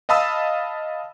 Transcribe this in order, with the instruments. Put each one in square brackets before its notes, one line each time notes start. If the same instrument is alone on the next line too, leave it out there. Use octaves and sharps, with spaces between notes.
[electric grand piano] D#5 F5 A5 B5 D#6 E6